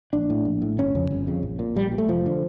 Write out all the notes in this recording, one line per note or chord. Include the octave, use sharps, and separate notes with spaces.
A#1 D4
A2
A#1
A2
G1 C#4
F2 C#3
G1
F2 C#3
A#1
A#2
A#1 G3
A#2
A3
F1 F3
D3